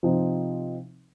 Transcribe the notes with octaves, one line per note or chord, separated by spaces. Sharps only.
C3 F3 C4 D#4